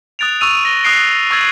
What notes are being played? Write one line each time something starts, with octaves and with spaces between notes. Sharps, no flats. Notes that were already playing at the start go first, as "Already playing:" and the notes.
D#6 F#6 A6 D7 F7
C#6 D#6 E6 D#7 F7
A#6 G7
D#6 F#6 A#6 C7 D7 G7
C#6 E6 G#6 A6 F#7